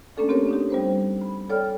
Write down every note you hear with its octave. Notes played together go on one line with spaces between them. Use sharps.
A3 A#3 C#4 D4 A4 D5
C4 G4 A#4 C#5
D4 D#4 G4
G3 B3 C5
B5
A4 C#5 D5 G5 F6